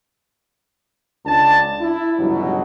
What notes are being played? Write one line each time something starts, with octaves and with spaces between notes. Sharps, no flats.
C#2 D4 A5
E4
C#2 G2 B2 D3 E3 F#3